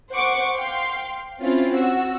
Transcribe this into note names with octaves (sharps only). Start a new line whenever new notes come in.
C5 F#5 C#6 D6
F5 G5 C6
C4 C#4 E4 F4
F#4 E6